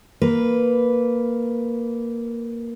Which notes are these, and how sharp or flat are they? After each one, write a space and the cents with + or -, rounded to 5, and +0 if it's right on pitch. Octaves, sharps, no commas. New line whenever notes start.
A#3 +0 B4 -5